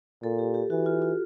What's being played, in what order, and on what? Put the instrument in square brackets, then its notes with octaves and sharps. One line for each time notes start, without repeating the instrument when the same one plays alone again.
[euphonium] A#2 [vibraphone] A4
[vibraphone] G4
G4
[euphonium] E3 [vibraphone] F#4
[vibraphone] F4
F4